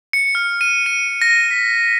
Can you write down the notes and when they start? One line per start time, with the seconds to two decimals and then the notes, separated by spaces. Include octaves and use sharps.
0.13 C#7
0.35 F6
0.61 D#7
0.86 D#7
1.22 A#6
1.51 B6